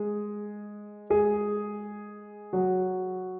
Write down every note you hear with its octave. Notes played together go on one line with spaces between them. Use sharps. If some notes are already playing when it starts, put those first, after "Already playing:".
Already playing: G#3 G#4
G#3 G#4
F#3 F#4